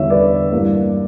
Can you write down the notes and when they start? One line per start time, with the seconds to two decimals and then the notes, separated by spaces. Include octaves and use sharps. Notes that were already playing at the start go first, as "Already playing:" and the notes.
Already playing: E2 D3 G3 C#5 E5
0.10 B4 D5
0.53 G2 E3 A#3